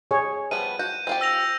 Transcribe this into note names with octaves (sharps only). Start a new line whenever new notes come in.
G#4 C#5
F3 G3 B3 D#7
F#4 G6
C4 F4 G4
E6 A#6 F7